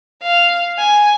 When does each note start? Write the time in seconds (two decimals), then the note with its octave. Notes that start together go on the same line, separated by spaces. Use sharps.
0.22 F5
0.79 G#5